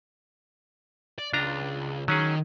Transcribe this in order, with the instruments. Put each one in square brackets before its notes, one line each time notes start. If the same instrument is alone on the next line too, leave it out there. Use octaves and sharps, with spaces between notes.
[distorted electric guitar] D5
[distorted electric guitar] C#2 [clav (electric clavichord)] D4 F4 A#5
[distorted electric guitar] D#3 [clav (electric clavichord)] F#3 C#4 G#4